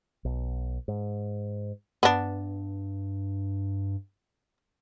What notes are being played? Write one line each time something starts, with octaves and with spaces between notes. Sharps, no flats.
B1
G#2
G2 B3 D4